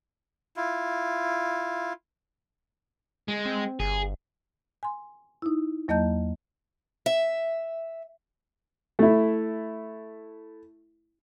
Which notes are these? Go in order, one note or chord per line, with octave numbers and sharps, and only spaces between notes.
E4 F4
G#3
C4
G1 G#4
G#5 C6
D#4 E4
E2 F#3 A#3 D#5 A5 G6
E5
A3 E4